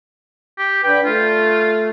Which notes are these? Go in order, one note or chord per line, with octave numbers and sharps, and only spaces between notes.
G4
D3 B4 G5
A3 F4